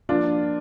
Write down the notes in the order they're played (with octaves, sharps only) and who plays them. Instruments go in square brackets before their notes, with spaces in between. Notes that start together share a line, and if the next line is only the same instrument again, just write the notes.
[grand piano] F3 A#3 D4 F4